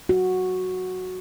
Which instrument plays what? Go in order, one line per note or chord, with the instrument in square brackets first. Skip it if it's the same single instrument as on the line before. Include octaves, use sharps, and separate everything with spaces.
[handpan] F#4